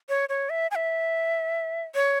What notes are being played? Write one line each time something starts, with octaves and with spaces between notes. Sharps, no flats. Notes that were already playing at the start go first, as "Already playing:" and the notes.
C#5
C#5
E5
G#5
E5
C#5